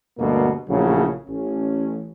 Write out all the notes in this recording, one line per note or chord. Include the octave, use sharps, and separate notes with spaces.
D2 G2 B2 A#3
A#1 A2 C#3 F#3
A1 C#4